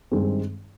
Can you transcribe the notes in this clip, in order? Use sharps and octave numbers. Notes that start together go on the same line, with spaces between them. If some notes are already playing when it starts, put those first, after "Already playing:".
G2 D#3 G#3 C4 D#4